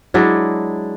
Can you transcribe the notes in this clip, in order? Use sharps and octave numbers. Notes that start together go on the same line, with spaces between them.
F#3 G#3 D4 E4